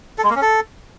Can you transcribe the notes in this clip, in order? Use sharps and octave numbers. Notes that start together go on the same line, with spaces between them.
A4
G#3
A#3
C#4
A4